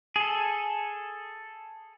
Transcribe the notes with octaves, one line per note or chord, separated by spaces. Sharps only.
G#4 A4